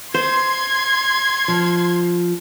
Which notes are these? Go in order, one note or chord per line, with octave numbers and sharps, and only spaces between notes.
C5 C6 G#6
F3